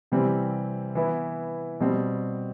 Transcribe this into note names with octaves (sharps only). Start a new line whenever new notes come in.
C3 E3 G3 C4
E3 B3 E4
B2 G3 C4